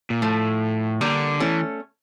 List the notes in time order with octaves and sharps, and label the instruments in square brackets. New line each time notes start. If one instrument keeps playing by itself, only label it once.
[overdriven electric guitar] A#2
[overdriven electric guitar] A2 [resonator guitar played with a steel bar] F3 A3
[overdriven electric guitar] D3 [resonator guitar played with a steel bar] G3 A#3
[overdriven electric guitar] E3 [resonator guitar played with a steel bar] A3 C#4